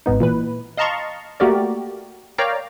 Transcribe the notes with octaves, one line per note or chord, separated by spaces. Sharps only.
G#1 G#2 B3 D#4
A#2 E3 B4
D#5 F5 A5 A#5 C6 C#6
A3 A#3 F#4 G4 A#4 D5
A#4 C#5 D5 F5 G5 A#5